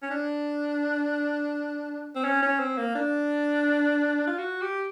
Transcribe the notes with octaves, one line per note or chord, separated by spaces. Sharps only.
C#4
D4
C4
C#4
C#4
C4
A#3
D4
F4
F#4
G4